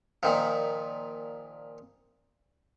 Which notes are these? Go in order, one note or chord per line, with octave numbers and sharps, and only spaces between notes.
A#2 D#3 F3